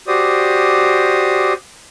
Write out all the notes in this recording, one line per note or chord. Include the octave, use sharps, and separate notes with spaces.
F#4 G4 C5 D5 D#6